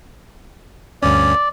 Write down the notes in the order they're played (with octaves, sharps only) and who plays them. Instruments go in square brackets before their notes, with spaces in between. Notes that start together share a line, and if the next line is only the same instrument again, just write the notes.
[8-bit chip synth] D2 G2 C#4 [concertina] D5